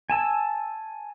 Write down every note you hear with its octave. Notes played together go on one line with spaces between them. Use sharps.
G#5 A5 E6